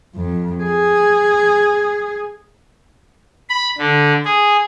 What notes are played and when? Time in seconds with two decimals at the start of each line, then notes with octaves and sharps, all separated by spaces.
0.16 F2
0.63 G#4
3.50 B5
3.78 D3
4.25 G#4